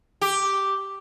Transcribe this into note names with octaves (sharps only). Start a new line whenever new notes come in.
G4